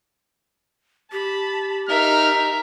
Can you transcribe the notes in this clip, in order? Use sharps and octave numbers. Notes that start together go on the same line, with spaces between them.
G4 A5 B5
D#4 A#4 E5 A#5 F6